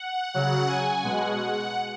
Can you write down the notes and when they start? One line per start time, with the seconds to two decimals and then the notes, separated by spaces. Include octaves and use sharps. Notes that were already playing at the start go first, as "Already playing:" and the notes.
Already playing: F#5
0.33 C#3 F#3 F#5
0.68 G#5
1.03 B2 G#3 F#5